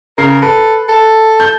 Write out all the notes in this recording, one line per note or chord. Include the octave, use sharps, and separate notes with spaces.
C#3 A#4 C7
A4 B4
A4
G6